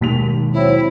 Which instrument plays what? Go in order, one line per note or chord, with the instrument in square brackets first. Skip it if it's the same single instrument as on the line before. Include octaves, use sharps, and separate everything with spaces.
[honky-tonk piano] D#2 B6 F7 [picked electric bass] B2 D#3 G#3
[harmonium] F#3 C4 [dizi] E4